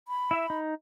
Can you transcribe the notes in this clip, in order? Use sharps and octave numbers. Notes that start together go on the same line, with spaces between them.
B5
E4 E5
D#4